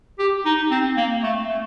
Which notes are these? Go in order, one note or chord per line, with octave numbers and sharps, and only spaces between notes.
G4
D#4
C4
A#3
A3
A3